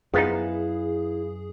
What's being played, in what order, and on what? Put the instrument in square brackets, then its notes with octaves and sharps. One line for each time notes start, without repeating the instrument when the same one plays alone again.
[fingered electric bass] F#2 [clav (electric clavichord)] F3 B3 D#4 [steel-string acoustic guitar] E4 B4 F5 [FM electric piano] G#4